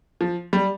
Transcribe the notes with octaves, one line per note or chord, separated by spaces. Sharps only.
F3
G3